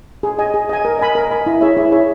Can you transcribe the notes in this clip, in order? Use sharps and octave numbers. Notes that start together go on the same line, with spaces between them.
G#4
D#5 G#5
G#4
D#5 G#5
A#4
D#5 G#5 B5
A#4
D#5 G#5 B5
E4
G#4 C#5 E5
E4
G#4 C#5 E5